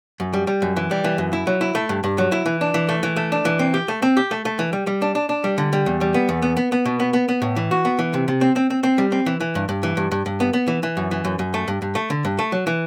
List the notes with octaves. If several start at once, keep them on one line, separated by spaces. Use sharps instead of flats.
F#2
G3
G3
F#2
E3
G3
E3
F#2
E4
F#3
E4
A3
G2
G2
F#3
E4
E3
D4
E3
A3
E3
A3
D4
E3
C4
G4
A3
C4
G4
A3
A3
E3
G3
G3
D4
D4
D4
G3
D3
G3
E2
G3
B3
E2
B3
B3
B3
B2
B3
B3
B3
A2
E3
F#4
B3
E3
C3
C3
C4
C4
C4
C4
G3
C4
E3
E3
G2
G2
E3
G2
G2
G2
B3
B3
E3
E3
F#2
E3
F#2
F#2
A3
G2
G2
A3
D3
G2
A3
F#3
E3